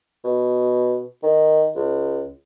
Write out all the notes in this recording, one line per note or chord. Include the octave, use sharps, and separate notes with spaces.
B2
D#3
C#2